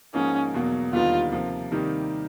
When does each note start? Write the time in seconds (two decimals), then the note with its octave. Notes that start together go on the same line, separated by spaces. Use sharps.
0.14 G#2 F3 A#3 C#4 D#4
0.54 E2 B2 F#3 A#3
0.93 D#2 D3 G3 B3 D#4 F4
1.32 C3 F3 A#3
1.72 C3 D#3 G3 A#3 D#4